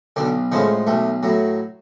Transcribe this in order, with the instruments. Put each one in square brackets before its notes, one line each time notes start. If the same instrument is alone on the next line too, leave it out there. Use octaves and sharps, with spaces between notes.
[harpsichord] B1 D3 D4
A2 C#3 F3 G#3 C#4
B1 A3
A2 F#3